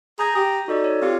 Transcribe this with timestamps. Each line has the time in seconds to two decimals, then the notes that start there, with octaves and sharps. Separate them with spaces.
0.19 G#4 A#5 G6 A#6
0.35 G4 D#6
0.68 D#4 F#4 A4 D5
0.84 C#5
1.02 C4 F4 G4